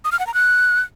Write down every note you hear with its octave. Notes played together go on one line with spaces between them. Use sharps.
D#6
F6
F#5
A#5
F#6